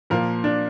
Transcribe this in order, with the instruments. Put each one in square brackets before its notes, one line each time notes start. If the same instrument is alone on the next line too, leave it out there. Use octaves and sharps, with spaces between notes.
[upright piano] A#2 F3 A#3 A#4
D4